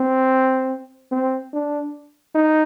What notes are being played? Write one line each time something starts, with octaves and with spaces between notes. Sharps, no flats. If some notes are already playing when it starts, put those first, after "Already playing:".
Already playing: C4
C4
D4
D#4